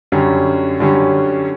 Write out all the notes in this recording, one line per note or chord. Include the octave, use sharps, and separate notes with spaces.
F#2 D3 G3 C#4
F#2 D3 G3 C#4